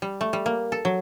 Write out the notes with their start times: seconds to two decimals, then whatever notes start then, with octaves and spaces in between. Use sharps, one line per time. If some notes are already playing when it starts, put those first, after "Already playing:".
0.02 G3
0.21 A3
0.33 G3
0.46 A#3
0.72 A4
0.85 F#3